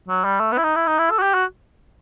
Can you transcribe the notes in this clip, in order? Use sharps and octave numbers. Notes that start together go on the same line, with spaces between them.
F#3
G3
A3
B3
E4
D#4
E4
D#4
E4
A4
F#4
G4
F#4